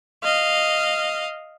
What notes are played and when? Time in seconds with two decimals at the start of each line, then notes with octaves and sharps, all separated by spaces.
0.24 D#5 F5